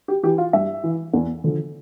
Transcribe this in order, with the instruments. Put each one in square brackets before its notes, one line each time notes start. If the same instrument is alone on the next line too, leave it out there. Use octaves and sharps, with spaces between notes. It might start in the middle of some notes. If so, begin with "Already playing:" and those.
[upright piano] G4
E3 G4
F4
G2 E5
E3
E2
D3 F3